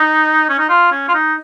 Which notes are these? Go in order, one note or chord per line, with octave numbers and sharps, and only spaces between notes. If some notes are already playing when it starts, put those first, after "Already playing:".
Already playing: D#4
C#4
D#4
F4
C#4
F4
D#4